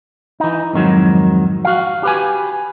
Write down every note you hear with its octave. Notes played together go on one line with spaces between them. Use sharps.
E3 D#4
F2 G#2 D#3 F#3
F#4 F5
G4 B4 G#5